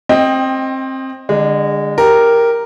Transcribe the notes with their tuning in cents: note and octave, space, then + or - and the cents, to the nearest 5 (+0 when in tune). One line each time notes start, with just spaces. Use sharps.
C4 +20 D#5 +0 G5 +0
D3 +10 G#3 -25 D4 +15
G4 +0 A#4 +0